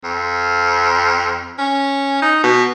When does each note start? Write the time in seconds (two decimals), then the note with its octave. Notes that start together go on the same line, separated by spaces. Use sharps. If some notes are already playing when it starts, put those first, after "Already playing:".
0.04 F2
1.59 C#4
2.22 D#4
2.43 B2